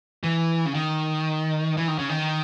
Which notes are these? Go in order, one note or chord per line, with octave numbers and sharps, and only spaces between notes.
E3
C#3
D#3
E3
D#3
C#3
D#3